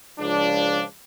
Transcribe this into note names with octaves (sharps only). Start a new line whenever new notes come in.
C#2 F3 D4